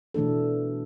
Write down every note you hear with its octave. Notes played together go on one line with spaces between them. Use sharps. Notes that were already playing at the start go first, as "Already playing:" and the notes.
B2 E3 A3 D4 A4